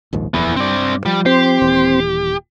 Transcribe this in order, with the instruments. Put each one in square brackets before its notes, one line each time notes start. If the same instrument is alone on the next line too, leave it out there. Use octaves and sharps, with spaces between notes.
[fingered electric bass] A#1 D#2 G#2
[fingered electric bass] D#1 F2 [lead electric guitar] E3 B3
[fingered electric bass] G2 [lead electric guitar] C4 D5
[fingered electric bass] F3 [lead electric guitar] G3
[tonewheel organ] C4 C6 [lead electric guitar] G4
[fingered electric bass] D#1 E3